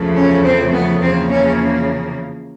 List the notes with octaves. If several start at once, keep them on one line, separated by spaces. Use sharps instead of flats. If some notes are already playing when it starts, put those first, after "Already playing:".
Already playing: E2 C#3 F3 A3
C#4
C4
B3
E2 C#3 F3 A#3 C4
C#4